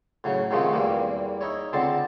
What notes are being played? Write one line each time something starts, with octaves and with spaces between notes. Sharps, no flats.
A2 C#3 F#3
G#2 C3 D#3 F3 G#3 A3
E2 E3 G3 A#3
D#4 E4 C#5
C#2 D3 C4 A5 C6